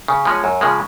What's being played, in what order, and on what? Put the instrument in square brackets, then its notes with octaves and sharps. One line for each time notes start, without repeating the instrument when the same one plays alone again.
[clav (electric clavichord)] C#3
F3 G#3 C#4
F#2
C#3 F3 G#3